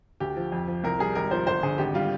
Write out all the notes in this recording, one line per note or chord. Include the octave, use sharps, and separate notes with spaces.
D2 G4
F3
F2
F3
C2 A#4
G3 G#4
G#1 A#4
F3 C5
G1 C5
D3 G#4
G#1 G4
G3 F4